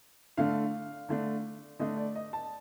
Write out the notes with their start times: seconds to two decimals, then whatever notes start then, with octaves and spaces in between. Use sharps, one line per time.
0.37 D3 A3 D4 F5
1.09 D3 A3 D4
1.79 D3 A3 D4 D#5
1.97 D5
2.15 D#5
2.33 A5